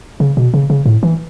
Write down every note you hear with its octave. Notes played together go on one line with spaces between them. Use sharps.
C#3
B2
C#3
C#3
A2
E3